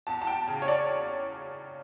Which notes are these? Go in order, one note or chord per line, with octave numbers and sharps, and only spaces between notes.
E2 A5
A5
G5
C#3
C#5
D5